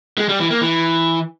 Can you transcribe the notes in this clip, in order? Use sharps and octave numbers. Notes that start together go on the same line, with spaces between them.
G#3
G3
E3
A#3
E3